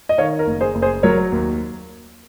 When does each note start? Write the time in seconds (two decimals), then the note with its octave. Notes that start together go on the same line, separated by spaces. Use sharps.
0.09 D#5
0.18 D#3 C#5 F5
0.39 A#4
0.47 F#1
0.61 G#4 C5
0.75 F#1
0.82 G#4 C5
1.03 F#3 A#4 C#5
1.32 D#2